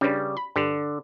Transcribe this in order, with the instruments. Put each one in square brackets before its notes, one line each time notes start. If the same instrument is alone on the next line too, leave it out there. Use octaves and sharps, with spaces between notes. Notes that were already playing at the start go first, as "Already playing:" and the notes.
[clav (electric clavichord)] C#3 G3 [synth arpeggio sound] C#4 D4 B4
[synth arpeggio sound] B5
[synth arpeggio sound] G2 G4 B4 [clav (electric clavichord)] D3